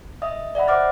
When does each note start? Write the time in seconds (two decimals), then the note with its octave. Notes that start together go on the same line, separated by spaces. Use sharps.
0.22 D#5 E5 D#6
0.55 D5 E5 F#5 B5
0.68 C5 E5 F#5 D6 F6 A6